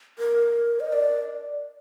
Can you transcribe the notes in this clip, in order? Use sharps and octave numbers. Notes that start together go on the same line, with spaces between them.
A#4
D#5
D5